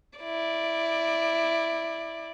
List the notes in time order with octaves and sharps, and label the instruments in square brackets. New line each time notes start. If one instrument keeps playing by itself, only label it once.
[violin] E4 D5